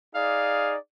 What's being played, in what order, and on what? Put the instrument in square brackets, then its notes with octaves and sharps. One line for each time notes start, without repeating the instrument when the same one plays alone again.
[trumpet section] D#4 G#4 D5 [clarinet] F5